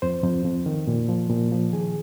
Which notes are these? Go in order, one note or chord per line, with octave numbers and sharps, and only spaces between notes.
F2 C5
F2
F2
D#3
A#2
F3
A#2
F3
D#3 G#4